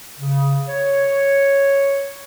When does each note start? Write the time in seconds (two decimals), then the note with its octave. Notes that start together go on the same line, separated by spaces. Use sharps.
0.19 C#3
0.67 C#5